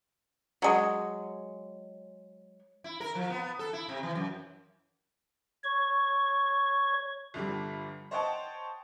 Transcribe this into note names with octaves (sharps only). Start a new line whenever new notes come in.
F#3 G#3
E4
A#4
F3
B3
A4
E4
C3
E3
F#2
C#5 C#6
G1 D3 F3 G3
C5 C#5 D#5 F#5 G5 A5